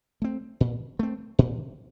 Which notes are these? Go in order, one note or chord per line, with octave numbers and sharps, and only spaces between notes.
A3 C4
A#2
A3 C4
A#2